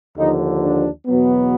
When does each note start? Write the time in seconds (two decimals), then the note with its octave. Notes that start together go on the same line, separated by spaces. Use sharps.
0.17 D#2 D3 F3 D#4
0.61 D4
1.06 E2 B2 F#3 B3